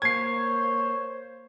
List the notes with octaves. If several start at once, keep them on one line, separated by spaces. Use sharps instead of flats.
A#3 C5 C#5 G#6 C7